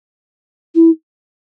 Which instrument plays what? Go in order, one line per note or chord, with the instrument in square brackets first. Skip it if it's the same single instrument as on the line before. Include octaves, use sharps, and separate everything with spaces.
[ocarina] E4